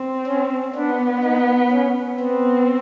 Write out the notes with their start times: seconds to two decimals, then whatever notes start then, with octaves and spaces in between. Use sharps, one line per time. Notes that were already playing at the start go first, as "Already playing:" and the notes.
Already playing: C4
0.27 C#4
0.75 B3 D4
1.24 D#4
1.72 C#4
2.19 B3 C4